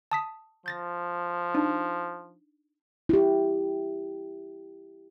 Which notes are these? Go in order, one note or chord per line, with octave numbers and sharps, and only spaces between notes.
A5 D#6 B6
F3 G6 A6 A#6
D4 D#4
E4 G4